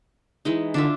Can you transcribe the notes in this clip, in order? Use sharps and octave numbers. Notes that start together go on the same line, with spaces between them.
E3 G#3 D#4
D3 D4 F4 E5